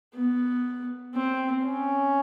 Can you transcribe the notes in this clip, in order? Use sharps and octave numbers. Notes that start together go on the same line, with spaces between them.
B3
C4
C#4